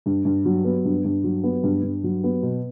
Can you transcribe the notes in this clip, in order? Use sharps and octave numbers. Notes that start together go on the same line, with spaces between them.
G2
G2
F#3
B3
G2
G2
F#3
B3
G2
G2
F#3
B3
B2